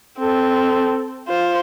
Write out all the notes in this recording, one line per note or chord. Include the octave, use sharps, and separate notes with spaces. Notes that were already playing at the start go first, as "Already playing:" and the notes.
C4 A4
F4 C5